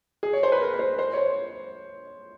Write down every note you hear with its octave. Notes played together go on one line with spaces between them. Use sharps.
G#4
C#5
C5
B4
A#4
B4
C5
C5
C#5
C5